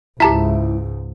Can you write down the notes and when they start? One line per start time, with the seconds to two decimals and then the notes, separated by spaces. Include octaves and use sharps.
0.20 C#2 G#2 E4 G4 A5 A#5 B6